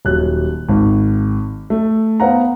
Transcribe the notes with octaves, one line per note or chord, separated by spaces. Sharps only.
D#1 F#3 F#6
G#1
A3
B3 C5 F5 F#5 A#5